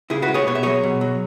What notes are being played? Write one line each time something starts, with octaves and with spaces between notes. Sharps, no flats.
C#3 E4 G#4
F#4 B4
G#3
G#4 C#5
B2 C#5
E5
F#3 G#4 C#5
B2
F#3